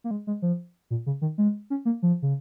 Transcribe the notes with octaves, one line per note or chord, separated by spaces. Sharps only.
A#3
G#3
G#3
F3
A#2
C#3
D#3
G#3
C#4
A#3
F3
C#3